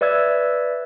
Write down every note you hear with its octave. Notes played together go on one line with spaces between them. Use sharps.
B4 D5 E5 E6 G#6